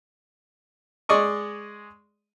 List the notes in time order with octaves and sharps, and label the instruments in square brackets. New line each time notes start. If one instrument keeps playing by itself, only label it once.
[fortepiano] G#3 D5 D#5 C#6